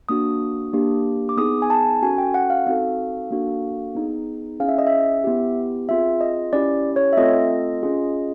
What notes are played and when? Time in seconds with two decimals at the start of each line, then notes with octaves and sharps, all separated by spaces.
0.09 A#3 D4 F#4 D#6
0.73 A#3 D4 G4
1.29 D6
1.37 B3 D#4 G#4 D#6
1.62 G#5
1.70 A5
2.02 C#4 F#4 A4 G#5
2.18 G5
2.34 F#5
2.50 F5
2.66 C4 D#4 F#4 A4 F5
3.31 A#3 D4 F#4 A4
3.95 B3 D#4 G#4
4.60 C#4 E4 G#4 F5
4.69 E5
4.78 D#5
4.87 E5
5.24 B3 E4 G4
5.89 C4 F4 G#4 E5
6.21 D#5
6.53 C#4 E4 G4 D5
6.96 C#5
7.13 E5
7.17 A3 C4 F4 A4 D#5
7.83 C#4 F4 G#4